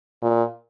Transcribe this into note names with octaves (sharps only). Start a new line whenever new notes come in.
A#2